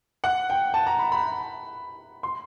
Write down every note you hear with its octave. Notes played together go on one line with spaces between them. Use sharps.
F#5
G5
A5
A#5
B5
B5
C6